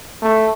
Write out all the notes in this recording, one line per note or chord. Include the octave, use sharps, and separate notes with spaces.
A3